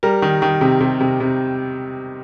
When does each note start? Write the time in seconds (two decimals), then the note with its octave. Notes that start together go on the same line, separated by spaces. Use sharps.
0.03 G3 A#4
0.22 D#3
0.42 D#3
0.61 C3
0.81 C3
1.00 C3
1.20 C3